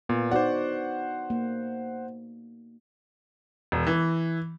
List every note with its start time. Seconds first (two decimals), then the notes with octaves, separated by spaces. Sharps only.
0.09 A#2 B3
0.31 D#4 F#4 C5 D5 F#5
1.30 A#3
3.72 E1
3.87 E3